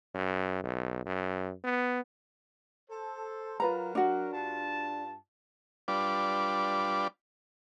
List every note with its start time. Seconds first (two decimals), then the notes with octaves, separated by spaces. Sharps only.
0.15 F#2
0.64 B1
1.06 F#2
1.64 B3
2.91 A4 C5
3.60 F#3 F4 A#4 B4 A#5
3.95 D4 F#4
4.33 G2 F4 A5
5.88 G3 D4 F4 B4 D6